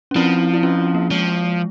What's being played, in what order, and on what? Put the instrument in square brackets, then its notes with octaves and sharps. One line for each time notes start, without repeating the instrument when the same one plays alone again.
[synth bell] C#4
[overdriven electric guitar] F3 [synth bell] C4 E4
[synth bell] E4
C#4 F4
A#3
[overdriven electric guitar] F3 [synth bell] G#3